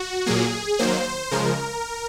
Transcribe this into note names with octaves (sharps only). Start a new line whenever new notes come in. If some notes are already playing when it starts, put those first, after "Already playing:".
Already playing: F#4
A#2 F#3 A#3 G#4
D#3 F#3 A#3 C5
C#3 F3 G#3 A#4